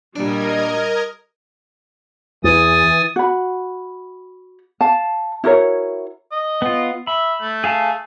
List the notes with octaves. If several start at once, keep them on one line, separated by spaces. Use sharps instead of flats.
A#2 G3 D4 A#4 D#5 G#6
E2 E3 G#5 D#6 A6
F#4 B5
F5 A5
E4 F#4 A#4 C#5
D#5
B3 F4
E5 B5
A3
G#4 F5 A5